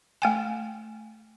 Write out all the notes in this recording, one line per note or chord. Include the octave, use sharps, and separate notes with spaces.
A3 G5 G#5